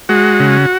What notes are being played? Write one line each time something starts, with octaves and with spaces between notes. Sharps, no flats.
G#3 F#4
C#3